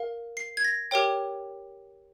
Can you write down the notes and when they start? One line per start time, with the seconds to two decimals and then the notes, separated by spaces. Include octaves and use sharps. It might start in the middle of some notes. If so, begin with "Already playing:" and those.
Already playing: A#4 F5
0.37 C7
0.57 G#6
0.64 A#6
0.91 G4 A#4 C#5 G5